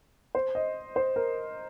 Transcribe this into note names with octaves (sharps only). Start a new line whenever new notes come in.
C5
D#5
C5
A#4